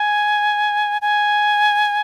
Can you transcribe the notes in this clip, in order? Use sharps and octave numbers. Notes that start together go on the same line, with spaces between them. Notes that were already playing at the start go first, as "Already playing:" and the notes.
Already playing: G#5
G#5